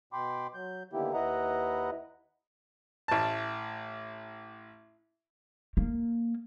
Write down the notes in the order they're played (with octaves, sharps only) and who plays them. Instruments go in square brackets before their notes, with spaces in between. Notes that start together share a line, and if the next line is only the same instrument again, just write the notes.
[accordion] B2 G5 B5 C6 D6
F#3 G6
D3 D#3 A#3 B3 E4 G4
D#2 E4 B4 D#5 F#5 A#5
[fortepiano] A1 A5
[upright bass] A#3